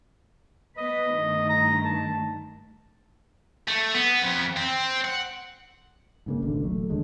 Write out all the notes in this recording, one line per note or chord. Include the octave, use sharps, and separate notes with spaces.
B3 B4 D#5
G2 D#3 A3
A#5
A5
A3
B3
F2
C4
F#5
G#2 C#3 A#3
D#1 A1 B2 D3
F#3 A3
D#2 D3 G#3